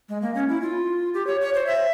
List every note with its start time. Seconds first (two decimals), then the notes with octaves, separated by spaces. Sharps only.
0.09 G#3
0.22 A#3
0.35 C#4
0.48 E4
0.62 F4
1.14 G4
1.27 C#5
1.41 C#5
1.54 C5
1.66 E5